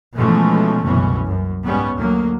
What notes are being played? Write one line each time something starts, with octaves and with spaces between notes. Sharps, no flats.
B2 E3 F3 G#3 A3 C#4
F#1 C2 B2 E3 C#4
F#2
G#2 G3 B3 C#4
D2 F#3 A#3